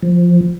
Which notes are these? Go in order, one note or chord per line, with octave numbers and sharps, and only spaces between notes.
F3